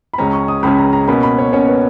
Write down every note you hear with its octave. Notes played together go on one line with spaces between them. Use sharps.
B5
C#2 C#3 G#3 C#4 A#5
C#6
D#6
C#2 C#3 G#3 C#4 B5
A#5
A#5
B2 A#3 C#4 B5
B5
C#5
B2 A#3 C#4 C#5
B4